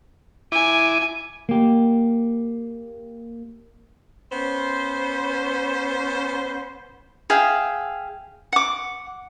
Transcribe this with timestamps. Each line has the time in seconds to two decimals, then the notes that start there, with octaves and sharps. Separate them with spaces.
0.52 E4 G#5 D6 D#7
1.49 A#3 G4
4.31 B3 C#4 C5
7.30 G#4 E5 F5 G5
8.53 F#5 D6